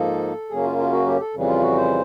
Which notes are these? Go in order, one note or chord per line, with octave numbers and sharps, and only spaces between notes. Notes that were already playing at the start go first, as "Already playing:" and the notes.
Already playing: G#2 F3 A#3 D#4 A4
F#2 C#3 F#3 A#3 C#4 G#4
F4
F4
F#4
G4
A4
F2 C#3 E3 G3
F4
F#4
C5